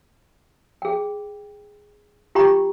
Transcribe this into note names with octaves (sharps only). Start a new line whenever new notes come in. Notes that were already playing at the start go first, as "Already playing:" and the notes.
G#4 G5
F4 G4 G5 A#5 C#6